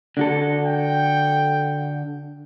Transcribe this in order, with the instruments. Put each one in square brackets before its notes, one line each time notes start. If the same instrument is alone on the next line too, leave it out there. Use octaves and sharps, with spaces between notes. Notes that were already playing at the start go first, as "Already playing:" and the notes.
[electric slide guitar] D3 F#4 A4
[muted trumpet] G5